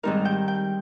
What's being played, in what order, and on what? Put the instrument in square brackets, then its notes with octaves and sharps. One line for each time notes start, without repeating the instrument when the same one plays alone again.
[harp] G#2 D#3 G3 C4 D#4 A#4
G5
G5